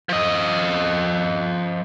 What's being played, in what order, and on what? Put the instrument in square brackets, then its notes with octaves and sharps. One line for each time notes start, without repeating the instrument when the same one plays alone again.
[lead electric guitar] F3 D#5